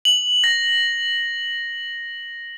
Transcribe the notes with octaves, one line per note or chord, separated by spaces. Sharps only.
F#7
A#6